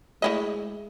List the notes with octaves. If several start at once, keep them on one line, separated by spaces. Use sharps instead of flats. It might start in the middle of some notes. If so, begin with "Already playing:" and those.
G#3 A3 E4 D#5